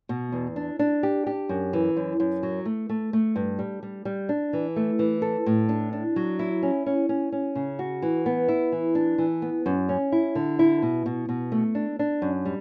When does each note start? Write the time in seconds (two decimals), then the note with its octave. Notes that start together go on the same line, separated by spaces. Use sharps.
0.09 B2
0.32 E2
0.56 D4
0.79 D4
1.03 G4
1.27 G4
1.49 F#2
1.73 E3
1.97 F#2
2.20 F#2
2.43 F#3
2.65 A3
2.89 A3
3.13 A3
3.36 G2
3.59 G3
3.83 G3
4.05 G3
4.29 D4
4.53 E3
4.76 A3
4.99 E3
5.22 A4
5.46 A2
5.69 D4
5.93 D4
6.16 F#3
6.39 E4
6.63 C#4
6.86 C#4
7.09 C#4
7.32 C#4
7.55 C#3
7.79 F#4
8.02 E3
8.26 B3
8.48 E4
8.72 E3
8.95 D4
9.18 E3
9.42 B3
9.66 F#2
9.89 C#4
10.12 E4
10.35 D3
10.59 E4
10.82 B2
11.06 B2
11.29 B2
11.52 A3
11.75 D4
11.99 D4
12.22 F#2
12.45 G3